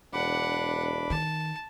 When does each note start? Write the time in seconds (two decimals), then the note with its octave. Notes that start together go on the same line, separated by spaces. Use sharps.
0.13 E1 D4 F#5 B5 D6
1.10 D#3 A5